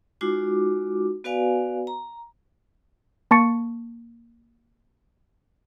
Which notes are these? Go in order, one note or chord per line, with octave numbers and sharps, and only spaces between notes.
G#3 D#4 F4 F#4 D6
B3 F#4 B4 D5 F5 G#5
A#5
A#3 A5 C#6 A6 C#7